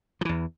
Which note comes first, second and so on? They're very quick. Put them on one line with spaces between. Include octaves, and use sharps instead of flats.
F3 E3 E2